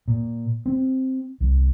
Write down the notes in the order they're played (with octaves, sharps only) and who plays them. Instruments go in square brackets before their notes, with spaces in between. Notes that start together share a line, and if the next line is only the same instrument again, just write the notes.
[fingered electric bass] A#2
C4
C2